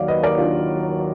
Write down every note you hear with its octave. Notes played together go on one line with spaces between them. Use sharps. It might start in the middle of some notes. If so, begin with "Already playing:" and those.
Already playing: D#2 D#3 F#3 D5 F5
B4 D#5
A#4 D5
D4 F4